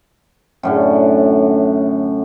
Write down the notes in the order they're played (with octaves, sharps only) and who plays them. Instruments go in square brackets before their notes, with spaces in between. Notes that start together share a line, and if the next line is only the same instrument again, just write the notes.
[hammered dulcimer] F#2 A2 D3